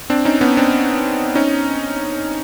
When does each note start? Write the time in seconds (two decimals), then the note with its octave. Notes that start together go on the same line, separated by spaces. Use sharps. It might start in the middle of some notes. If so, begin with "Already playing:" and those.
0.10 C4 D4
0.25 C#4 D#4
0.41 B3 C#4
0.57 C4 D4
1.35 C#4 D#4